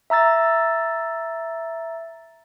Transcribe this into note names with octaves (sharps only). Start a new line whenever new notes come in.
E5 A#5 E6 A6